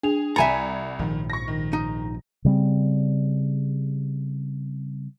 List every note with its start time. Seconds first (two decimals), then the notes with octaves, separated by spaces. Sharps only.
0.03 D4 G#4 F7
0.36 C2 E5 G#5 A#5 B5 G#6 A6 C#7
0.99 A#1 G#2 D#3 F3
1.30 C#6 A#6
1.48 D#3
1.73 D#4
2.45 C#3 G3 C4